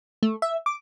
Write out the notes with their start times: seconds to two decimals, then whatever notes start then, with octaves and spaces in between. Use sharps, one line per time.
0.23 A3
0.42 E5
0.66 D6